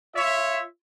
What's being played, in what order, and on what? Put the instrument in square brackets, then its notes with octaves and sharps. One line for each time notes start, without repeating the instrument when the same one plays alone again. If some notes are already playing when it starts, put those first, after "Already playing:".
[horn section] F4 C#5 E5